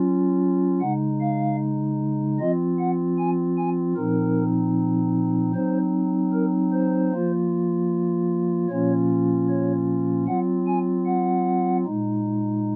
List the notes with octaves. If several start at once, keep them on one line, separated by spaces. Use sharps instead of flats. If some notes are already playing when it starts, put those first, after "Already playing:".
Already playing: F#3 C#4 F4
C#3 G#3 D#4 F#5
F5
F3 C4 F4 D#5
F#5
G#5
G#5
A#2 F3 C4 D#4 A#4
F#3 C4 D#4 C5
A#4
C5
F3 A#3 F4
A#2 F3 A#3 C#4 F4 C#5
C#5
F#3 C4 F4 F#5
G#5
F#5
A#2 G#3 D#4